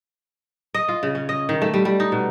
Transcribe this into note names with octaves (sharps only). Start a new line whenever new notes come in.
D#5
F4
C#3
C#4
D#5
D#3
A3
G3
G3
D#4
B2